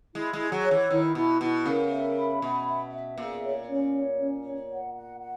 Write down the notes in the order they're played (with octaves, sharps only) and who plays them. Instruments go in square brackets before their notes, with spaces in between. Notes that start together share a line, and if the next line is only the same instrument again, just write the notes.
[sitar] G#3 [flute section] E4
[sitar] G#3
[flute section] G#4
[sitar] F#3
[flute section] C#5
[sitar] E3
[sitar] D#3 [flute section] E4
[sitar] B2 [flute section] E4
[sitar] B2 [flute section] E4
[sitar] C#3 [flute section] A#4
[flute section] E5
B5
[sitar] B2 [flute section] E5
[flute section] E5
E5
[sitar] A#2 [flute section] G#4
[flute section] C#5
C#4
C#5
C#4
C#5
F#5
F#5
F#5